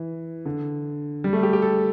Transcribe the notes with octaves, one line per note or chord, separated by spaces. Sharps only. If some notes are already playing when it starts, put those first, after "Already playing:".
Already playing: E3
D3
G3
A3
G4
G4
A4